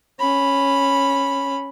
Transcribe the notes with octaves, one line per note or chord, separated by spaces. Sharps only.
C#4 B5